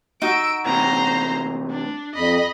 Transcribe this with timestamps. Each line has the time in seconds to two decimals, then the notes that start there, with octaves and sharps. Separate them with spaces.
0.22 D#4 F#4 E6 D7
0.65 A2 C3 E3 C5 A#5
1.71 D4
2.15 F2 D#5 B5